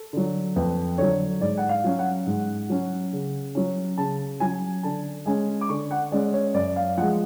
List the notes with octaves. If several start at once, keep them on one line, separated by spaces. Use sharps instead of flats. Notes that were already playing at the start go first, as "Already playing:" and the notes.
Already playing: A4
D3 F#3
F2 B4
D3 F#3 C#5
G#2 D5
F#5
F5
F#3 C#4
F#5
G#2
F#3 C#4
C#3
F#3 C#4
C#3 A5
F#3 C#4 G#5
D3 A5
G#3 C#4 G#5
D6
D3 C#6
F#5
G#3 C#4 D5
C#5
F#2 D5
F5
F3 G#3 F#5